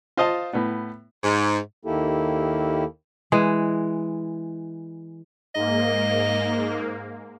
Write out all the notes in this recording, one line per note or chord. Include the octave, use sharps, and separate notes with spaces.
F4 C5 D#5 F5 A5
A2 B3
G#2
D#2 D#3 A#3 E4 G4 A4
E3 G#3
G#2 A#3 D#5